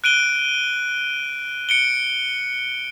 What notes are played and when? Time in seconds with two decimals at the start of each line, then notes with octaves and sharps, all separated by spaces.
0.04 F#6 D7 D#7 G7
1.69 C#7 D7 G7